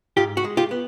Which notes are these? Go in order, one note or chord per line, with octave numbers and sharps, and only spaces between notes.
G#2 F4 G4
F#4
G#3
F4 G4
B3